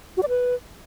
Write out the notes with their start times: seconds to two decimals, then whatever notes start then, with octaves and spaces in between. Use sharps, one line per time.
0.17 F#4
0.23 D5
0.29 B4